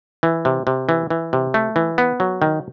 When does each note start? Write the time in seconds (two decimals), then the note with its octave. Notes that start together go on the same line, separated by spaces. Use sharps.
0.23 E3
0.45 C3
0.67 C3
0.89 E3
1.10 E3
1.33 C3
1.54 A3
1.76 E3
1.98 B3
2.20 F#3
2.42 D#3